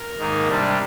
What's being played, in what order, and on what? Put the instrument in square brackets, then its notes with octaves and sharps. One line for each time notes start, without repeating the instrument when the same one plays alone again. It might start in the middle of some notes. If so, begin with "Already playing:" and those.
Already playing: [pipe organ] A#4
G#2 D#3 A#3 D#4
C3 G3 D4